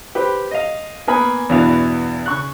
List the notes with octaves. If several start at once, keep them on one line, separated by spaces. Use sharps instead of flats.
G4 B4 C5
D#5 F5
A#3 B3 A#4 G#5 B5 D#6
E2 G2 B2 E3 F5
C#3 C#6 F#6